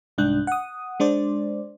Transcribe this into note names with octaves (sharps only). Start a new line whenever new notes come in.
C2 G#2 D4 F#6 G6
F#5 D#6
G#3 D4 C5 D5